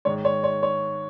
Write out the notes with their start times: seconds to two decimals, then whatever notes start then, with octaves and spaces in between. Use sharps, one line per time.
0.05 G#2 D#3 G#3 C#5
0.25 C#5
0.44 C#5
0.63 C#5